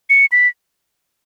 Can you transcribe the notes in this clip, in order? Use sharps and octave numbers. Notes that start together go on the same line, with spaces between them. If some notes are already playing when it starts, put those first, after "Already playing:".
C#7
B6